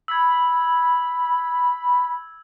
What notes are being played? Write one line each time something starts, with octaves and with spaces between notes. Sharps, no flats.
B5 E6 G#6